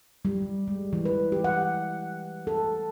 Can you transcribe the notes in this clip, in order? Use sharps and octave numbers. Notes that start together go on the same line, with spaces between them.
G3
G#3
E3
B4
G4
F#5
A4